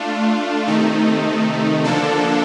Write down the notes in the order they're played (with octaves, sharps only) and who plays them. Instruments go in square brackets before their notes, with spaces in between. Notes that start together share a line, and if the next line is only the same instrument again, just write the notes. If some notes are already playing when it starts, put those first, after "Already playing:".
Already playing: [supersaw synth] A3 D4 F4
C3 D#3 A3 D#4
D3 F3 A#3 D4 A4